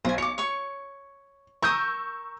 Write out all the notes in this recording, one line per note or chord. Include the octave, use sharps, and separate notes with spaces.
B1 C5 G#5
C#5 D6 C#7
C#5 C#6
A#4 C#6 D#6 E6 G6